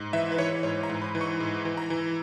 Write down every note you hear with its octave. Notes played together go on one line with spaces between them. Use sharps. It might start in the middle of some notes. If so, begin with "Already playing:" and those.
Already playing: G#2
E3 E5
B4
E3 C#5
G#2 C#5
A#5
G#2
B5
E3
C#6
G#2
E3
A#5
E3